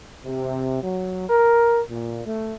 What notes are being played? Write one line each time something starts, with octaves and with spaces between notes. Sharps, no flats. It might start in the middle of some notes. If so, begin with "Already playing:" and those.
C3
F#3
A#4
A#2
A3